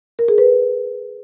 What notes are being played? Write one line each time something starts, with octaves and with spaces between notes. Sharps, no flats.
A#4
G#4
B4